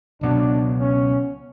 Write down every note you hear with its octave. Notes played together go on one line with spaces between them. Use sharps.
C#2 B2 F#3 B3 D4
C#4